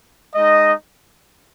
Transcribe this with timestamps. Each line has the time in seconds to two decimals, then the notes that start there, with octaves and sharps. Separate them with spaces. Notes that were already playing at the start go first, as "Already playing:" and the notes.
0.35 G#3 D#4 D#5